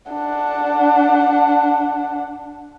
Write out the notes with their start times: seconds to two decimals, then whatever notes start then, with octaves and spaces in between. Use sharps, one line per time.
0.11 D4 F#5